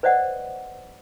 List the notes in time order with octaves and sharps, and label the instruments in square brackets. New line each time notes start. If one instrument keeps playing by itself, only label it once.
[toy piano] B4 C5 D5 D#5 F#5